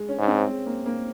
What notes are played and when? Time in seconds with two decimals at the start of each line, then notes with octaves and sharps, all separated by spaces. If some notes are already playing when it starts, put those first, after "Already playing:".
Already playing: G#3
0.09 C#4
0.19 G#2
0.28 C4
0.48 G#3
0.66 A#3
0.86 A#3